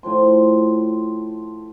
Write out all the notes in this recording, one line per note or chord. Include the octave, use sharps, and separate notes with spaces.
A2 F3 C6